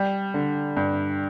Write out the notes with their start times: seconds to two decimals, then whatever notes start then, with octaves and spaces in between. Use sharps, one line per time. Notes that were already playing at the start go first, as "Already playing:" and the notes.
Already playing: G3
0.34 D3
0.77 G2